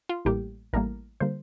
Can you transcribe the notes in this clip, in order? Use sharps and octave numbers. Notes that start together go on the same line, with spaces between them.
F4
A1 A2 G3 A#3 G4
A1 A2 G3 A#3 A#4
D3 G3 A#3 C5